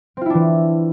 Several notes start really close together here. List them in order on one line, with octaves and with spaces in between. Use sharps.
C4 F4 E4 D4 E3